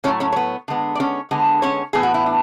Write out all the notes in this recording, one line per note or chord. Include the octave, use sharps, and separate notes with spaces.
A2 F#3 A3 C#4 C#5
C#4 C#5
C#5
B3 B4
D3 G#3 B3
D5
C#4 C#5
D3 G#3 B3
C#4 C#5
A2 E3 B3 G#4
F#4
E4
D4